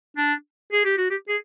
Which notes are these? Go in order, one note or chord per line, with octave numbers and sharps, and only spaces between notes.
D4
G#4
G4
F#4
G4
G#4